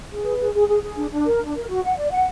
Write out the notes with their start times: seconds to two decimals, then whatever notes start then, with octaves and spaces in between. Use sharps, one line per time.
0.10 G#4
0.24 B4
0.39 G#4
0.53 G#4
0.67 G#4
0.82 G#4
0.97 D4
1.11 D4
1.25 A#4
1.39 D4
1.54 A#4
1.68 F#4
1.83 F#5
1.97 D5
2.11 F#5